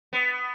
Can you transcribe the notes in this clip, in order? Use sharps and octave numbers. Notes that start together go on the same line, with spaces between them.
B3